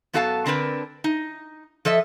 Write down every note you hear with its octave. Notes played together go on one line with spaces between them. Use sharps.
F#2 B3 F#4 A4 F5 A5
D3 C4 D4 A#4 B4
D#4
F3 A4 D#5 E5